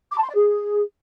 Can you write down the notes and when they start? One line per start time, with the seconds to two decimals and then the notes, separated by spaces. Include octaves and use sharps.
0.12 D6
0.18 A5
0.23 C6
0.29 D5
0.35 G#4